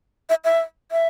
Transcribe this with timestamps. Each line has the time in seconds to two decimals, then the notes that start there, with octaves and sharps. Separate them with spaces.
0.29 E5
0.45 E5
0.92 E5